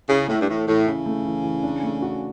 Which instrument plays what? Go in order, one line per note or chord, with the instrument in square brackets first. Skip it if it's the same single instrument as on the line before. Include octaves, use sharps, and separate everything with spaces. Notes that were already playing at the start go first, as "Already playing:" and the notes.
[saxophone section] C#3 [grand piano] E4
[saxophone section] A2 [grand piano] A3
[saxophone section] G2
[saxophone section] A2 [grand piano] E3
[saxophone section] A2 [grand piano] E3
[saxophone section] C#3 [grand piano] E4
[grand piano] A3
E3
E3
D4
A3
F#4